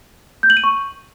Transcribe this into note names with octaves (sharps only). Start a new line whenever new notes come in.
G6
F#7
D#7
C#6